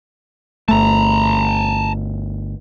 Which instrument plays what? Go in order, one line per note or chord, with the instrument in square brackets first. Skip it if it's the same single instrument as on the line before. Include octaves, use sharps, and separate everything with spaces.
[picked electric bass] G1 A3 [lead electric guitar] A5 A#5